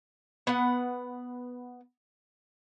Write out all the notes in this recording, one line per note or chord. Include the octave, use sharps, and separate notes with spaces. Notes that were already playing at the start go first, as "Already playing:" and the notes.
B3 F#5